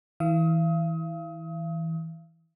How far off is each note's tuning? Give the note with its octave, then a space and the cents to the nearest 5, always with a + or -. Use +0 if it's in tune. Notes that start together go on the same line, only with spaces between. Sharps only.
E3 -25 F5 -40 D#6 +35